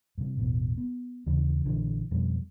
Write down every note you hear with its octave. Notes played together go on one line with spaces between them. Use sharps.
G2 C3
E1 A1 B2
B3
D#2 C#3 E3
A#1 D3 E3
F2 B2 G3